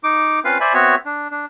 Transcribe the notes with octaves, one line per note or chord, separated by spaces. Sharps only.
D#4 D6
C4 C#4 F4 B4 F5
C5 D5 E5 G#5 B5
B3 C4 F#4 C#5 E5
D4
D4